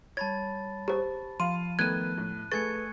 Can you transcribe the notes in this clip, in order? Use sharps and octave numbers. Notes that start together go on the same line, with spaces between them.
G3 C#5 A5 B5 G#6 A6
G4 C5
F3 F5 C6 D#7
D#3 A3 B3 F#6 G#6 D#7
A2
A3 G#4 B4 C#6 G#6 A6 C#7